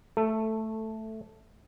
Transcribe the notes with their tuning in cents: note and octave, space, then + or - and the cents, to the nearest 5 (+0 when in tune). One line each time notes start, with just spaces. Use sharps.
A3 +0 A4 +15